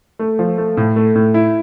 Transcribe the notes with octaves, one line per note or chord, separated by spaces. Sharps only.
A3
F3
A3
A2
A3
A2
E4